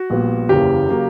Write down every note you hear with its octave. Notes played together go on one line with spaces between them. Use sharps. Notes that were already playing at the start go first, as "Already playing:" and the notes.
Already playing: F#4
A#1 A#2 G3 B3
F#1 E2 C#3 E3 A#3 G4
C#3 F#3 A#3